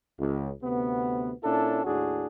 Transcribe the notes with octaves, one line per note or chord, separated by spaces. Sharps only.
C#2
D2 C3 B3
A#2 C#4 D4 E4 A4
D#2 A2 D4 F#4 G#4